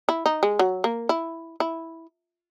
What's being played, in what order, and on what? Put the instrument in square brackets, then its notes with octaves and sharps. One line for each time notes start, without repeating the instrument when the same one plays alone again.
[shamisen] E4
D#4
G#3
F#3
A#3
E4
E4